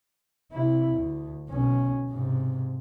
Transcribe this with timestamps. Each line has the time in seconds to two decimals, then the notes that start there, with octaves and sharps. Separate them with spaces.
0.52 C3 E4
0.95 D2
1.49 B1 C#4
2.10 G#2 C3